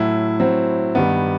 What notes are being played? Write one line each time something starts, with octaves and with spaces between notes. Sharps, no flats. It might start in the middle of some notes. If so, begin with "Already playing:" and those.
Already playing: A2 F#3 E4
A2 F#3 C4
G2 D#3 G3 B3